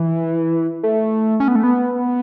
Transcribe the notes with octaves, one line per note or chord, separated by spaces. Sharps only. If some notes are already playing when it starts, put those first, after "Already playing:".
Already playing: E3
A3
C#4
B3
A3
B3